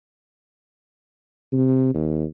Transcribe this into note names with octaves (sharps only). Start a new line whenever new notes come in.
C3
D#2